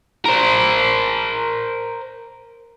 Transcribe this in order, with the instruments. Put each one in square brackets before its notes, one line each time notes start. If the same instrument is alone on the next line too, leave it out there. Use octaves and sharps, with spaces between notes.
[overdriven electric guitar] A#4 C5